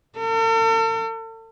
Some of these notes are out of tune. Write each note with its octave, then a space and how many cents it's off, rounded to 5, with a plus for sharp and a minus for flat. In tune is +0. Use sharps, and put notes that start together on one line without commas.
A4 +45